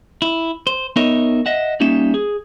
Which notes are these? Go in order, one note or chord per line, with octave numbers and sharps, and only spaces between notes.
E4
C5
B3 D#4 A#4 C#5 D#5 E5
D#5 E5 F#5
G3 A#3 C#4 D#4 E5
G#4